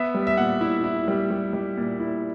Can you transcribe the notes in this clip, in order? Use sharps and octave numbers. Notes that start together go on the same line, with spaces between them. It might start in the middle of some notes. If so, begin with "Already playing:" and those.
Already playing: B3 E5
G3
E5
A#2 F#5
E4
E4
G3
G3
G3
A#2
E4